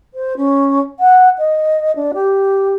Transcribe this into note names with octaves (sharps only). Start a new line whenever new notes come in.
C5
C#4
F#5
D#5
D4
G4